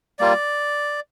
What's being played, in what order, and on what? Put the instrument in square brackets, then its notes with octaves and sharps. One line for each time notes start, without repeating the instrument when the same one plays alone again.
[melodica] G3 A#3 F4 D5